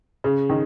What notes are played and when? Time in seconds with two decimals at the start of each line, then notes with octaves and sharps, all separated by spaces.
0.24 C#3
0.50 D#3